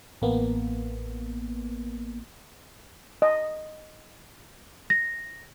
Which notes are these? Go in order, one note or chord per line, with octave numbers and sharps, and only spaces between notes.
A1 A#3 B3
D#5
A#6